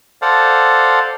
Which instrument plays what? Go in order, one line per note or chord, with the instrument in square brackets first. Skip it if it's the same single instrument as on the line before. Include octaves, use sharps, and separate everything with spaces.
[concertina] A4 C5 D5 F5 F#5